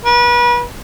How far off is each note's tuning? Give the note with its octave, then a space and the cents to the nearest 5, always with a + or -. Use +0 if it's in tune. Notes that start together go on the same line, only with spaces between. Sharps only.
B4 -35